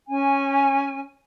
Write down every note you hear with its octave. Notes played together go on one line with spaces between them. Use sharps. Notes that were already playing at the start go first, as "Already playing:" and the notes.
C#4 G#5